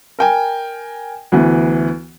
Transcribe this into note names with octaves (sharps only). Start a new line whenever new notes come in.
A#4 G5 G#5
D2 E3 B3